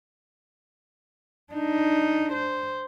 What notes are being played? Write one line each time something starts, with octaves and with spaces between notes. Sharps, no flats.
D4 D#4
C5